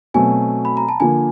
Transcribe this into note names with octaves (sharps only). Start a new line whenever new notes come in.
B2 F#3 A3 C4 G#5
B5
A#5
A5
D3 F3 A#3 G#5